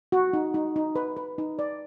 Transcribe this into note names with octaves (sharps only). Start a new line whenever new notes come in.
F#4
D#4
D#4
D#4
B4
B4
D#4
D5